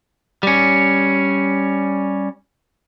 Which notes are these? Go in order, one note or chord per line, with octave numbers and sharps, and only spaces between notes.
G3 C#4